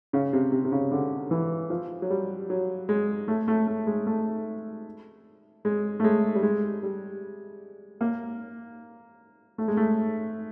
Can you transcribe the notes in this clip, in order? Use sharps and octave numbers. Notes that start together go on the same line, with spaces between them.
C#3
C3
C3
C3
C#3
D3
E3
F3
F#3
G3
F#3
G#3
A3
A3
A3
G#3
A3
G#3
A3
G#3
G3
G#3
G3
A#3
A3
G#3
A3